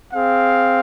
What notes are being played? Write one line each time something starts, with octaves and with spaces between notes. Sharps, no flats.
C4 G#4 F5